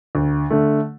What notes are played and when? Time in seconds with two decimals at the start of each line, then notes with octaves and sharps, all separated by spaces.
0.15 D2
0.50 D3 A3